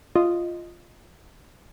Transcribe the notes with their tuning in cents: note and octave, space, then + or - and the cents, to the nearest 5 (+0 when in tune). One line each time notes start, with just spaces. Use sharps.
F4 -5 D#5 +0